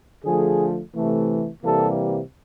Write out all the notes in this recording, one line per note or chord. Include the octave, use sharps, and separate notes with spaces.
D3 F3 A3 G#4
C3 E3 A3
C3 E3 G3 A#3 A4